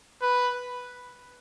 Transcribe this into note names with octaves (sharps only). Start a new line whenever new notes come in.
B4